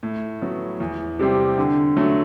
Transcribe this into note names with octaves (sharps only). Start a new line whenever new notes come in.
A2
F#3 B3
E2
C3 G3 C4 G4
D3
F#3 A3